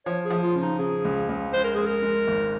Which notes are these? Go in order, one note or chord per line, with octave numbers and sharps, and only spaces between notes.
F3 C#5
G#4
F3
F4
C#3
D#4
C#3 G#4
C#2
C#2
G#3 C5
A#4
G#3 G#4
A#4
G#3
G#1